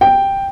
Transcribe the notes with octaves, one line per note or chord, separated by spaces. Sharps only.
G5